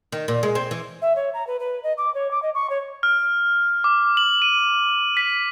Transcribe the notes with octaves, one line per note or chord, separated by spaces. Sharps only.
D#3
A#2
G#3
C4
E3
E5
C#5
A#5
B4
B4
D#5
D6
C#5
D6
D#5
C#6
C#5
F6
D6
F#7
D#7
B6